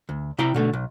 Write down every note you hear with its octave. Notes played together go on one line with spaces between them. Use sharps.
D2
C3 E4 G5 A#5
B2 D3 A3
B1